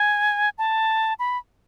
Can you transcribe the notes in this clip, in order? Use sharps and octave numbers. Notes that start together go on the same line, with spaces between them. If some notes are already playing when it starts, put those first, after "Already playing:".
Already playing: G#5
A5
B5